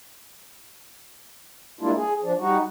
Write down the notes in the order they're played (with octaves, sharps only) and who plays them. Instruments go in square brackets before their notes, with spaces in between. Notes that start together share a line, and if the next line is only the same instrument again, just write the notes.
[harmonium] G3 G#3 A#3 D4 E4 F4
G#4
F3 D4
G3 D#4 F#4